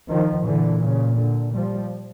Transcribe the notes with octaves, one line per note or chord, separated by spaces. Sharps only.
D#3 F3
A#2 D3 E3
C#3
D3
F3 G3